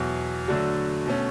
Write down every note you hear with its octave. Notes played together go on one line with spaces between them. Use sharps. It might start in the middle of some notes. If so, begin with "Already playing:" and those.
Already playing: E2 B2 F#3
D3 F#3 A3 D4 F#4
B2 A3 C#4